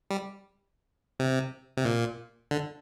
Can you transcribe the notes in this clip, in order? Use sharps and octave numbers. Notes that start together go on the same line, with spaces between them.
G3
C3
C3
A#2
D3